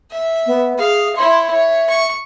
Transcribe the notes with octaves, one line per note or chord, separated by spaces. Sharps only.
E5
B3
G#4 F5
E4 C#5 C6
C#5 E5
C#6